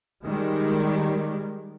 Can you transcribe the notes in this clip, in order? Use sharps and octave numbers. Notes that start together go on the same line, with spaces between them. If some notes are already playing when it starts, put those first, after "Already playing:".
D#3 G3 G#3